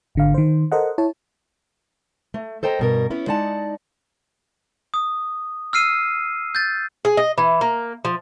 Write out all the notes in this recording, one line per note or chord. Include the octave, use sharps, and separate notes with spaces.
G#1 D3 F5
D#3 C5
A4 A#4 C5 D#5 F#5
E4 C#5 A5
A3
A4 C5 D#5 G5 A#5
G2 B2 A#4
B3 C#4 E4
G#3 D#4 D5 F#5 A5
D#6
E6 F6 C7 D#7
G6 A6
G#4
D#5
E3
A#3
F3